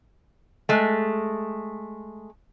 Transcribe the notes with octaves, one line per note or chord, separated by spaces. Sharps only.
G#3 A3